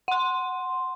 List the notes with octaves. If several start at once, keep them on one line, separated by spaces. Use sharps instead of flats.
F#5 C6